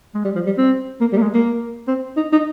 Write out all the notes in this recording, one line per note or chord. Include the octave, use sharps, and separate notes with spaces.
G#3
G3
F3
G3
C4
A#3
G3
A#3
G#3
A#3
C4
D#4
D#4